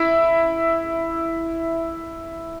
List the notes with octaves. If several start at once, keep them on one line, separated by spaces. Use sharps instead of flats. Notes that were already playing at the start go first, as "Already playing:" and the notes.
Already playing: E4 E5